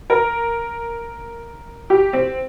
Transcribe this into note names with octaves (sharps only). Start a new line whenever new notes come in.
A#4
G4
C4